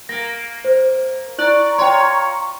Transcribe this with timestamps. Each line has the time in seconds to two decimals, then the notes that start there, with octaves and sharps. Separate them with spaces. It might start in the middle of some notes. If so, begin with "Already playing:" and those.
0.09 A#3 A#6
0.64 C5
1.38 E4 D5 A#5 C#6 F#6 F#7
1.78 F4 C#5 G5 C6